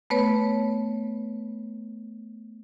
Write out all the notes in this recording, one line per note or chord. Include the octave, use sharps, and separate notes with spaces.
A3 B3 B4 C#5